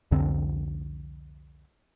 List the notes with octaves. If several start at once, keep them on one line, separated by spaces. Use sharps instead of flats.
C2 F2 D3 C4